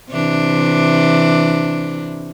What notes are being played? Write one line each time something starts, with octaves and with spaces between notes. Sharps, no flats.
C3 E3 D4